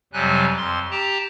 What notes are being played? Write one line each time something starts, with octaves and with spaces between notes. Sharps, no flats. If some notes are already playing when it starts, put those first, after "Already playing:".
F2 C3 F#3 G3 G#5 F#6
F2 C6
G4 G5 A5 A#5